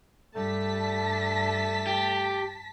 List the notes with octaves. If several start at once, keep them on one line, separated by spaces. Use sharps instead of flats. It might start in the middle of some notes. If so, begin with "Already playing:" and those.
G2 G3 A3 A5 B6
G4